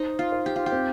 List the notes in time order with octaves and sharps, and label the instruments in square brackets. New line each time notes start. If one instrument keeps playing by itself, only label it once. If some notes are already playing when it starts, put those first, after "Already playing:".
Already playing: [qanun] D#4 [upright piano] C5
[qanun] F4
[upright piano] C5
[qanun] G4
F4
G4
[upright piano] C4